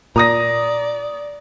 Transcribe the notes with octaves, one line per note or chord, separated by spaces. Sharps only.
A#2 D5 A#5 D#6 A#6